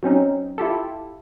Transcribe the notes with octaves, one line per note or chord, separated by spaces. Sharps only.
F#3 C4 C#4 D#4
E4 F4 G4 A4